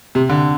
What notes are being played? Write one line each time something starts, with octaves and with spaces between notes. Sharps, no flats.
C3
D3